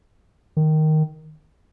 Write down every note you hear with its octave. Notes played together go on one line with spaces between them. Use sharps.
D#3